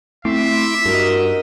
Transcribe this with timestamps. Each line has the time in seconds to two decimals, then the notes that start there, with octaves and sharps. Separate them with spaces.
0.25 A3 C4 E4 E5 C6 D6
0.86 G2 F#4 A#4 D#5